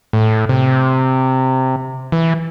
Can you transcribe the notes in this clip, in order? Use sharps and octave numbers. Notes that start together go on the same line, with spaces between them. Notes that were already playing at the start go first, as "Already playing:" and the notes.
A2
C3
E3